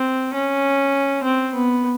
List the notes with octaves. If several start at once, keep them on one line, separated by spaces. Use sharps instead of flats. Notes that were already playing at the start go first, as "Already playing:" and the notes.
Already playing: C4
C#4
C4
B3